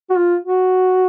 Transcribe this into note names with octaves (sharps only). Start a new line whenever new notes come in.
F#4
F4
F#4